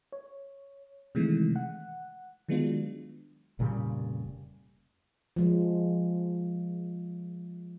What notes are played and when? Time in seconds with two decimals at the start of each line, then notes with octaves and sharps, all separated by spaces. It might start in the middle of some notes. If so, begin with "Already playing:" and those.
0.12 C#5
1.15 C3 D#3 E3 G#3 A3
1.56 F#5
2.49 D#3 F#3 G#3 B3 D4 F4
3.59 F1 A#2 C#3 G3
5.36 F3 G#3